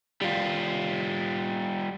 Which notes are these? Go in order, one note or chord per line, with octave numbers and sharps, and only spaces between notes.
G3 F4